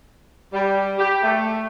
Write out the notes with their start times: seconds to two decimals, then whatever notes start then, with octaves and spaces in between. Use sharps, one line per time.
0.53 G3
0.99 G4
1.23 A3